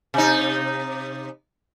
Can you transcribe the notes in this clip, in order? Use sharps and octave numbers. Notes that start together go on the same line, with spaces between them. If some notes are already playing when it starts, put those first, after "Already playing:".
C3 D#4